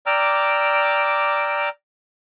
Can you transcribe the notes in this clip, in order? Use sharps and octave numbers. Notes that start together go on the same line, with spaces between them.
D5 G5 A#5 D6 E6 F6